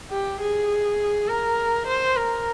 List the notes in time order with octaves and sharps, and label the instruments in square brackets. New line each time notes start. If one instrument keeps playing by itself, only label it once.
[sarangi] G4
G#4
A#4
C5
A#4